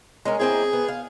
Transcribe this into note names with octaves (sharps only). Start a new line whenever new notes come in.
G#3 C#4 A#4
A#3 C4 E4 G#4
B3
F5